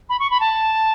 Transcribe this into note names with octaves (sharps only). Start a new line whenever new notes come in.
B5
C#6
B5
A5